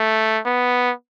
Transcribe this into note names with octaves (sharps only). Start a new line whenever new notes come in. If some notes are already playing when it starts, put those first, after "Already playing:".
Already playing: A3
B3